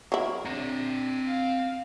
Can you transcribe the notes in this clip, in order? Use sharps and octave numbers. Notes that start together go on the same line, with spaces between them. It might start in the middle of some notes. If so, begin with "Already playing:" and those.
F#3 E4 A#4
C4 D4 A#5
F5